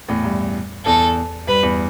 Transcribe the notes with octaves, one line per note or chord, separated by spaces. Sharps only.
E2 A2
G2
E2 A4
G2 B4
E2